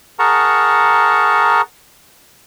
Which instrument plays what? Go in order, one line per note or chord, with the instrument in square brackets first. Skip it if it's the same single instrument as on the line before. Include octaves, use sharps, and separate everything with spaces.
[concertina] G#4 A#4 F#5 A5 A#5 C#6